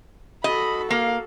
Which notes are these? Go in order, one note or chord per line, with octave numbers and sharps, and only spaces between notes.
F#4 A4 D#5 B5
A#3 F5